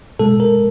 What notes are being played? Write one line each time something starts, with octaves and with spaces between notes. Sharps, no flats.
B2 G#3 A4
A#4